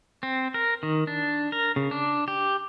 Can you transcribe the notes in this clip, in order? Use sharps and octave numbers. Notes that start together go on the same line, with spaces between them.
C4
A#4
D#3
D4
A#4
C#3
D4
G4